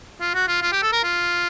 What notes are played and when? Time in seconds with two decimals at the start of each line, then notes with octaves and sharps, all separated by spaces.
0.21 F4
0.35 F#4
0.48 F4
0.62 F4
0.72 G4
0.83 A4
0.93 A#4
1.04 F4